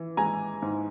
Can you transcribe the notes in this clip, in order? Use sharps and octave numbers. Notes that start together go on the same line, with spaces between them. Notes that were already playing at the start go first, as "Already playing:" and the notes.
Already playing: E3
G#3 G#5 A#5
G#2